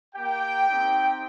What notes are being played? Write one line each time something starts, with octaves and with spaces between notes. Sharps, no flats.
A#3 G4 G5
C4 D#4 G4